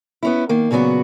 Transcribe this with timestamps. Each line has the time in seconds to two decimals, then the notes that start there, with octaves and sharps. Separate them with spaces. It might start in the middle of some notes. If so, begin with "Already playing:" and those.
0.23 B3 C#4 E4
0.49 D#3 A#3
0.71 A#2 C#3 F#3 B3 F#4